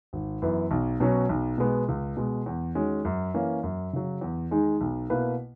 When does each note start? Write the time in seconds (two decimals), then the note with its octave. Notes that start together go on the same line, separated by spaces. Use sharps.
0.13 G#1
0.42 F#2 E3 B3
0.71 B1
1.00 B2 F#3 C#4
1.29 B1
1.58 B2 G#3 B3
1.88 C#2
2.17 B2 G#3
2.46 E2
2.75 D#3 G#3 C#4 F#4
3.05 F#2
3.34 E3 A#3 C#4
3.63 F#2
3.93 C#3 F#3
4.21 E2
4.51 D#3 G#3 D#4 G#4
4.81 B1
5.10 B2 A#3 E4 B4